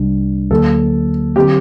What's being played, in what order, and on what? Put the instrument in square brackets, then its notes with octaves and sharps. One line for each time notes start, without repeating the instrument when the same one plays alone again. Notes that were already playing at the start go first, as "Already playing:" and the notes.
Already playing: [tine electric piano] C2 C3 G3 D4
[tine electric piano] D2 D3 F#3 A#3 [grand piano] A4
[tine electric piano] D3 F#3 C4 [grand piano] G4